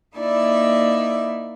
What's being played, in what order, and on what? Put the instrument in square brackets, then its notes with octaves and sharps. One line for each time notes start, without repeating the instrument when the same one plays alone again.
[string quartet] A#3 D#4 E4 D5 E5